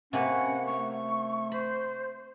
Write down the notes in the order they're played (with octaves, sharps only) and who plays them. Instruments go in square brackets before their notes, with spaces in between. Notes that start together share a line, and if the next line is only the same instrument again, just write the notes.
[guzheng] C3 A#3 B4 [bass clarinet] C#4 [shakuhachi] F#5
[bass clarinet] A3 [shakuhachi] C#6
[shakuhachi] C5 [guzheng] B5